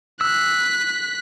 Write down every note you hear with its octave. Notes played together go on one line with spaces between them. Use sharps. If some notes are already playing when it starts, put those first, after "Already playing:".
E6 F#6 B6